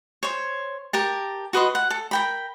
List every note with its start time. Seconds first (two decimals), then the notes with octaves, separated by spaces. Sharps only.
0.23 C5 C#5
0.93 G4 A#4 A5
1.53 F#4 B4 D#5 C6
1.75 F#5
1.90 A4
2.11 A#4 G5 B5